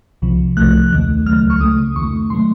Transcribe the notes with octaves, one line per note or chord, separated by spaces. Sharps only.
C2 C3 F3
C2 C3 F3 A3 F#6
D#2 D#3 A3
C#2 C#3 F#3 A3 F6
C#6
C#2 C#3 A3 D#6
F2 D#3 A3 C#6
C3 F#3 A3 C6